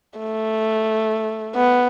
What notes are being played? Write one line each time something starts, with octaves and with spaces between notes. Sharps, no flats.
A3
B3